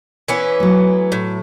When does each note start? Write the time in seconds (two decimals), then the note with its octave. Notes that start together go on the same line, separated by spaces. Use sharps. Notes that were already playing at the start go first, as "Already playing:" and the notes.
0.28 E3 B3 C#4
0.60 F#3 A3
1.12 A2